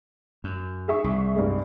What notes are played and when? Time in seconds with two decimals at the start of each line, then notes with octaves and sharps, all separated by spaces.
0.44 F#2
0.88 G#4 E5 C#6
1.04 C2
1.36 G2 G#3